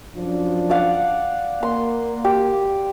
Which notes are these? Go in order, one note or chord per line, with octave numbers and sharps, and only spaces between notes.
F#2 F3 D4
D5 F5 F#5
A#3 C6
G4